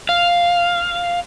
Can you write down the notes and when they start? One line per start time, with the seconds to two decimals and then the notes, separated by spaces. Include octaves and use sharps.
0.09 F5